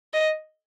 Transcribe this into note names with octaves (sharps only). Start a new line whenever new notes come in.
D#5